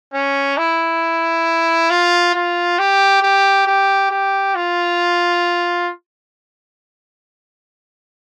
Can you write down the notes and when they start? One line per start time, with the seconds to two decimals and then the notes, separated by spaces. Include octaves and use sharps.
0.14 C#4
0.57 E4
1.90 F4
2.35 F4
2.79 G4
3.23 G4
3.67 G4
4.11 G4
4.55 F4